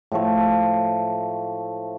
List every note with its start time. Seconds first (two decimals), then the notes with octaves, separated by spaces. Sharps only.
0.12 A2 F3 A3